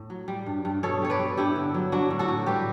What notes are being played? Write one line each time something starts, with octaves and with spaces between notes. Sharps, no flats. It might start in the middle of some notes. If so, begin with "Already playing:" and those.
Already playing: A2
F#3
G3
G2
G2
B2 A4 C#5
G3 C#5
B4 D5
G3
G2 E4 G4
D3
F#3
F#3 D4 F#4
A2
F#4 A4
A2
G3 G4 B4